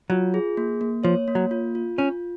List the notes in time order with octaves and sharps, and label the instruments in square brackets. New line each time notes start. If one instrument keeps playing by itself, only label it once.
[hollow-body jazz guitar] F#3 [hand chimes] F4
[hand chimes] G#4
A#3
A#3
[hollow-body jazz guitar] F3 [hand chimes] C#5
[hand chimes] A#3
[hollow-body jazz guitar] F#3
[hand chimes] F4
F4
[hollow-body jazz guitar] C#4 [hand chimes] F4